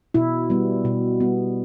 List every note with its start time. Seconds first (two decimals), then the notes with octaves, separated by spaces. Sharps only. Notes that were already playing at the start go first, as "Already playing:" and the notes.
0.14 B2 E4
0.50 G3 B3
0.85 B2
1.20 G3 B3